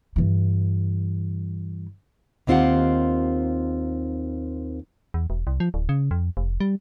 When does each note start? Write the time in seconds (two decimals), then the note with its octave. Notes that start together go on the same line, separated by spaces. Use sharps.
0.16 G2 E3
2.47 D#2 D#3 C4 F4 G4 F#5
5.14 E2
5.30 E1
5.47 C2
5.60 F3
5.74 D1
5.89 C#3
6.11 F2
6.37 F1
6.60 G3